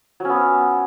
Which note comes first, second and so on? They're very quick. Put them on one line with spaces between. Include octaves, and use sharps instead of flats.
F#3 C#4 B3